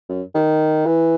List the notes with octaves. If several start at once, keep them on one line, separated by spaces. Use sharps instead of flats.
F#2
D#3
E3